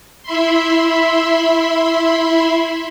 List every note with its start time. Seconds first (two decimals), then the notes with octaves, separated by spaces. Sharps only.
0.23 E4 E5 B5 C6